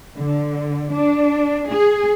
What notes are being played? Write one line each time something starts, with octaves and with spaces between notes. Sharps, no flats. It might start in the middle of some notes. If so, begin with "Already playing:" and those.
D3
D4
G#4